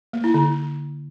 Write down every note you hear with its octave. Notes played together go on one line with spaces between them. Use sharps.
A#3
E4
D3